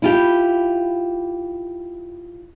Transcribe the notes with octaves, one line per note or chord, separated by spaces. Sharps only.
E4 F4 G4